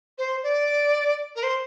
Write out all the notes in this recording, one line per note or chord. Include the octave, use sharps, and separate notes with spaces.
C5
D5
A#4
C5